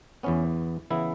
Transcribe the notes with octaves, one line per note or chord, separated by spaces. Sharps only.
E2 E3 B3 C#4
C#3 E3 B3 E4